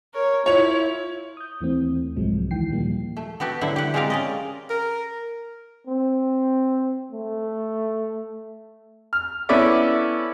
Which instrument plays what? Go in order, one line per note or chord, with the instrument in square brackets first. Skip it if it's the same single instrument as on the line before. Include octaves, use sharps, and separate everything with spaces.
[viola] A#4 C#5
[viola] E4 [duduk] F4 [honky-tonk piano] C#5 F7
[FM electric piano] D#6 G6
D#2 E3 A3 C4
C2 G#2 C3 F3 F#3 G#3
D#2 D#3 E3 G5 C7
A#2 F3 G3 A#3
[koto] A3
B3 F#4 G4 A4
D3 F#3 E4 C5
G4 F#5
G#3 C4 F4 G4 A#4 F5
C#4 D5 D#5
[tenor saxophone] A#4
[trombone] C4
A3
[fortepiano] F6
B3 C#4 E4 A4 D5 E5